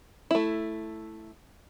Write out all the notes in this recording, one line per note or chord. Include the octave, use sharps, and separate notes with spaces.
A3 E4